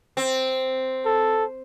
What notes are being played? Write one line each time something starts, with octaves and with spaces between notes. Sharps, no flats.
C4
A4